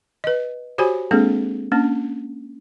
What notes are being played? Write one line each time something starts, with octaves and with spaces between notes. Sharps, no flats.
B4 D#5
F#4 G4 C5 C#5 G#5 B5
G#3 A#3 C4 D4 G#4 A4
A#3 C#4 D4